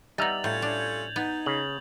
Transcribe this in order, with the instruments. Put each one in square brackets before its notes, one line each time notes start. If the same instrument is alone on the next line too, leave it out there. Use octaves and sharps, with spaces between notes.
[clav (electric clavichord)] G3 E5 A#5 [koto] B3 D#4 [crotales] A6 F7 F#7
[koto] A2 [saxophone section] C#4 F4 A4 [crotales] G6 G#6
[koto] D4
[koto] B3 [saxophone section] D#4
[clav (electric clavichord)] C#3 [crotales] F#7